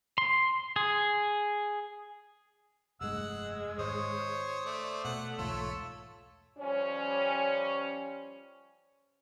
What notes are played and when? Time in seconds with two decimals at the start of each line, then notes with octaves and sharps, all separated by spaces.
0.18 C6
0.76 G#4
3.01 F1 G2 G#3 A3 F#5 E6
3.78 G#2 D#3 C5 C#5 D#6
4.65 A3 D5
5.05 B2 A3 F#5
5.38 B1 E2 G#2 F4 A4 C#5
6.58 F3 G3 C#4